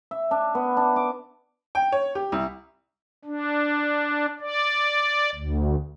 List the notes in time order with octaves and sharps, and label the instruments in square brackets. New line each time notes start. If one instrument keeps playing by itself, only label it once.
[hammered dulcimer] E5
D4
B3
D4
D6
[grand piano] G5
C#5
G4
C2
[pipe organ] D4
D5
D2